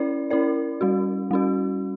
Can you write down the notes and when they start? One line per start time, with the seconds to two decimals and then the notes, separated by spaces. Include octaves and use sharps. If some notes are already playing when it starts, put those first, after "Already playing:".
Already playing: C#4 E4 A#4 D5
0.30 C#4 E4 A#4 D5
0.81 G3 C#4 F#4
1.31 G3 C#4 F#4